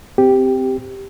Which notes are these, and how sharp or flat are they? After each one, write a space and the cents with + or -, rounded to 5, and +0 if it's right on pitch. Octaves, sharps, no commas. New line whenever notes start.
C4 -15 G4 +0